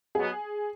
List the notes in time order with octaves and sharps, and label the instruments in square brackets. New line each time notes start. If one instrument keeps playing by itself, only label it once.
[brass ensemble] B2 F#3 B3 [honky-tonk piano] G#4